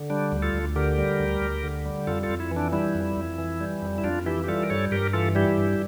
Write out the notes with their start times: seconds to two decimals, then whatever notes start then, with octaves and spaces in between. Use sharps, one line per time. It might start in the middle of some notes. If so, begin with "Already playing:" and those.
Already playing: D3
0.10 G3 D4
0.32 D2
0.42 F4 A4
0.54 D2
0.76 D3 G4 A#4
0.98 G3
1.19 D2
1.41 D2
1.63 D3
1.85 G3
2.07 F2 F4 A4
2.23 F4 A4
2.29 F2
2.40 E4
2.51 E3
2.56 D4
2.72 G3 E4
2.95 F2
3.17 F2
3.38 E3
3.61 G3
3.82 F2
3.98 E4
4.04 F2 D4 F4
4.26 E3 E4 G4
4.44 G4
4.48 G3 F4 A4
4.63 A#4
4.70 G2 A4 C#5
4.91 G2 G4 A#4
5.13 E3 F4 A4
5.35 G3 E4 G4
5.57 G2